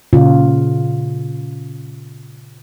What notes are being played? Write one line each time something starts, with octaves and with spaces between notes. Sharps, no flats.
A#2 C#3 F4